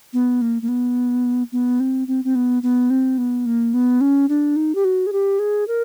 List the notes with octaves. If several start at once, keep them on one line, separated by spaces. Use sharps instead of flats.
B3
A#3
A#3
B3
B3
C4
C4
C4
B3
B3
C4
B3
A#3
B3
C#4
D4
D#4
G4
F#4
G#4
G4
G#4
A#4